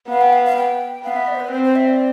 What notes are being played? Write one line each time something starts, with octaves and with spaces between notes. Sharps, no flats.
B3 F5
G5
F5
F5
G5
B3 F5
E5
D5
C5
B4
C4 C5
C5
E5
D5